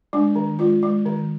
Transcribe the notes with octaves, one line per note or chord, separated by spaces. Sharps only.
G#3 D4
D#3
G#3 F4
G#3
D#3